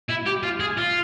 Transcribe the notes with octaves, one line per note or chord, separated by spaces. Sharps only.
E4
G4
F4
G#4
F4